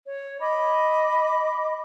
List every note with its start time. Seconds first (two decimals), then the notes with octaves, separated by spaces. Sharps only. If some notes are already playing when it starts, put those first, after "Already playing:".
0.06 C#5
0.41 D#5 B5 D6